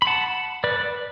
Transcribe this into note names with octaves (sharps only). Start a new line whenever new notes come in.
B5
F#5 A5
B4 D5